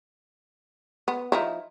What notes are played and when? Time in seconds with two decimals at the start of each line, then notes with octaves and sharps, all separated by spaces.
1.08 B3
1.32 F3 D#4 E4